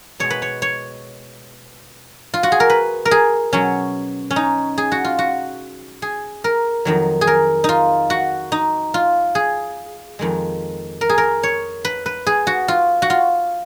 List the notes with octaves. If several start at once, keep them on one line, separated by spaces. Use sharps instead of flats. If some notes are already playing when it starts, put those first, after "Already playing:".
B2 G#3 C#5
B4
C#5
C#5
F4
F#4
G#4
A#4
B4
A#4
G#4
B2 F#3 C#4
C#4
D#4
G#4
F#4
F4
F#4
G#4
A#4
F2 D#3 F#3
G#4
A#4
D#4 F4
F#4
D#4
F4
G#4
F2 D#3 G#3
A#4
G#4
A#4
C#5
B4
B4
G#4
F#4
F4
F#4
F4